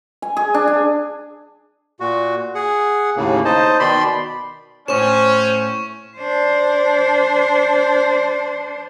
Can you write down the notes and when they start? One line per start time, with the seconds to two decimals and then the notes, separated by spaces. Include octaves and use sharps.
0.22 G#5
0.37 G#4
0.54 D4
0.68 G#5
2.00 A#2 F#4
2.55 G#4 F#5
3.16 D#2 A2 C#3 A#3
3.45 D#4 C5 D#5 A5
3.80 B2 D#3 D5 B5 C6
4.88 A2 C#4 C5 C#5 C#6 E7
6.17 D4 C5